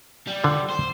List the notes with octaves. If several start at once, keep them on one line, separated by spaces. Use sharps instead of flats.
G3
D3 F4
C5